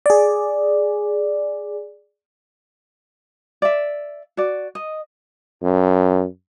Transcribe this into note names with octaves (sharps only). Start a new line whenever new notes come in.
G#4 D5
D5 E5
F#4 D5
D#5
F#2